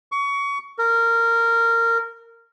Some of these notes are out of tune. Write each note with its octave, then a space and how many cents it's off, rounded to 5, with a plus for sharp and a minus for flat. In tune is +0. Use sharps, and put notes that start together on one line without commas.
C#6 +25
A#4 -15